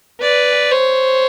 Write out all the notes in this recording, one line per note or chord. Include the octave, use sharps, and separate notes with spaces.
B4 D5
C5 C#5